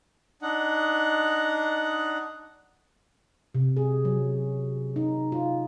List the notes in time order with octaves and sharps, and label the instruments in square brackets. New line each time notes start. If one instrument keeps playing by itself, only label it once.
[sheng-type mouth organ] D4 D#4 F#5
[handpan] C3
G#4
F#3
D#4
F4